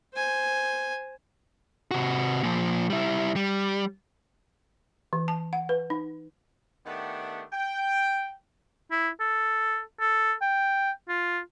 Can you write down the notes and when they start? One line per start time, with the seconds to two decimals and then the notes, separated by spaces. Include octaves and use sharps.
0.14 C5 G#5
1.91 C3 F#4
2.43 A#2 F3
2.90 G3 E4
3.36 G3
5.13 E3
5.28 A5
5.53 F#5
5.69 B4
5.90 D#4
6.86 D#3 A3 B3 D4 G4 F#5
7.52 G5
8.91 E4
9.20 A4
10.00 A4
10.41 G5
11.08 F4